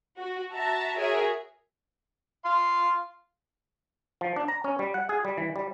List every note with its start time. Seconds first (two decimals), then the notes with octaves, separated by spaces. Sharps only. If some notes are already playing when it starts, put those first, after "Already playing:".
0.18 F#4
0.53 F#4 E5 A5 A#5
0.97 F#4 G#4 A#4 C#5 E5
2.45 F5 C6
4.21 F3
4.36 D4
4.48 A#5
4.64 C#4
4.79 G3
4.94 F#5
5.09 G#4
5.25 G3
5.38 E3
5.56 G3